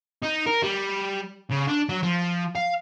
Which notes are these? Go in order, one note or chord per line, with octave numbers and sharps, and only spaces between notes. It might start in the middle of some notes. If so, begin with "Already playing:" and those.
D#4
A#4
G3
C#3
D4
F#3
F3
F5